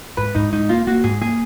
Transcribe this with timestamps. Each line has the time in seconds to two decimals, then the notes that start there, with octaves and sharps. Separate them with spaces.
0.17 G#2 B4
0.35 G#2 D#4
0.52 G#2 D#4
0.69 A#3 F4
0.87 A#3 F#4
1.04 G#2 G#4
1.21 A#3 G#4